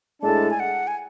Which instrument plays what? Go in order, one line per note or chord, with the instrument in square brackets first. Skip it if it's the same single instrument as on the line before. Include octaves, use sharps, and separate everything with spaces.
[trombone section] A2 G#3 D4 A4 [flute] A5
[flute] G#5
F#5
G#5